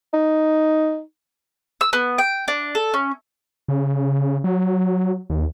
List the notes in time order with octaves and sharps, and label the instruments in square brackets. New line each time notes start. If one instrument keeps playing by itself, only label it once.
[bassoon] D#4
[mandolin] E6
B3
G5
D4
A4
C#4
[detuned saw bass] C#3
F#3
D#2